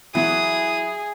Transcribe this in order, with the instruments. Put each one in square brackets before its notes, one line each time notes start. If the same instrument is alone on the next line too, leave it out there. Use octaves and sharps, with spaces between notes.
[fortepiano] E3 F#3 [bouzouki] E4 [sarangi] G#4 [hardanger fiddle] D#6